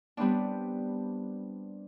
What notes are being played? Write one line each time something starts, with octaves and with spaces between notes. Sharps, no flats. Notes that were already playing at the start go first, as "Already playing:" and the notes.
G3 B3 C4 D4